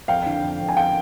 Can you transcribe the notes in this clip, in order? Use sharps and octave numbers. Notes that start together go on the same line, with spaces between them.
F2 F5 G5
D3
F2
F2
G#5
F5 G5